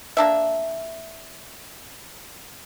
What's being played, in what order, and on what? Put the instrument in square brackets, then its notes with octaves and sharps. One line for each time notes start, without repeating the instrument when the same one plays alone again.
[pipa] A#3 D4 E5